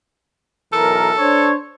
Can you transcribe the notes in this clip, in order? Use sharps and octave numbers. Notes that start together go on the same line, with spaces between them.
B1 E3 A4 A#4
D4 C5 C#5